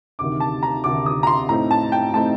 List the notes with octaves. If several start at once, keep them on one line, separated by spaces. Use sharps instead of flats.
D2 C3 D#3 D6
A5
A#5
D2 C3 D#3 D6
D#6
A#5
C6
A2 A3 C4 D#4 A#5
A5
G5
A2 A3 C4 D#4 A5